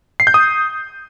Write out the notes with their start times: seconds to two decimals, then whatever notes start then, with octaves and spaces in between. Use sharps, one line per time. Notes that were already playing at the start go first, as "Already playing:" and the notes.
0.20 C7
0.27 G6
0.34 D#6